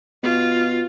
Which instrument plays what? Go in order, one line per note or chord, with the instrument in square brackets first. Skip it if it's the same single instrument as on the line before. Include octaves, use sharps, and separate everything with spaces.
[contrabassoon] B2 [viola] F4